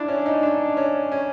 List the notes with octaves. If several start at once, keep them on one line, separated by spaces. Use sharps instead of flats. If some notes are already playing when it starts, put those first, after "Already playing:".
Already playing: D4 E4
C#4
D#4
D4
C#4
C#4